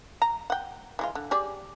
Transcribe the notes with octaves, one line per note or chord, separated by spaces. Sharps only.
A#5
F#5 G5
E3 G#3 F4
D3
G4 G#4 D5